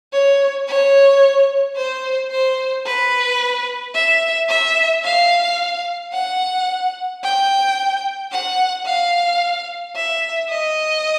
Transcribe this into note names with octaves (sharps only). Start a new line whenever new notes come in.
C#5
C#5
C5
C5
B4
E5
E5
F5
F#5
G5
F#5
F5
E5
D#5